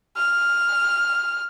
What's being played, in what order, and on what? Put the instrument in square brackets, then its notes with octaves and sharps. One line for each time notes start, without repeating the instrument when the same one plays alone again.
[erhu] F6